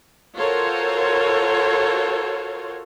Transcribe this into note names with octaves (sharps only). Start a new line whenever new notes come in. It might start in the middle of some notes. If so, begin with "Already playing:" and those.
F4 F#4 A4 A#4 C5 C#5